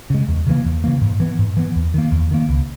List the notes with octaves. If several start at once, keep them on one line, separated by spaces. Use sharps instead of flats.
C#3 G#3
E2
C#3 E3 A#3
E2
C#3 E3 A#3
G#2
E3 B3
G#2
E3 B3
E2
D#3 A#3
E2
D#3 A#3
C#2